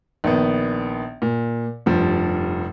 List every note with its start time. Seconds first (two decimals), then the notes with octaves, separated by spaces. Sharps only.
0.24 A#1 D#3 B3
1.22 A#2
1.86 F1 G2 F3